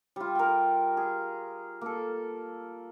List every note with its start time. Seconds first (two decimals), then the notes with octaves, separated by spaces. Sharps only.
0.16 G3 F4
0.35 A#4 G5
0.97 G#4
1.81 A#3 A4